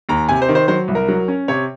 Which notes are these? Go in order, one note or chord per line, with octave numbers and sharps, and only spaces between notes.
D#2 A#5
C3 G#5
C5
D#3
C5
F#3 C5
C2
A#4
F#3
C#4
C3 C#5